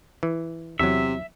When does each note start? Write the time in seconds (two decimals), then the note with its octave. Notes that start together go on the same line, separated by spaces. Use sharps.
0.23 E3
0.79 E2 C3 F#3 E5